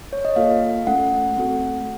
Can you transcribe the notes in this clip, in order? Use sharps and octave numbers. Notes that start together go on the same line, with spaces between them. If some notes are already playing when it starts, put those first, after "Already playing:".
C#5
D#5
A#3 F4 A4 F5
A3 C#4 A4 F#5
A3 C4 F#4 A4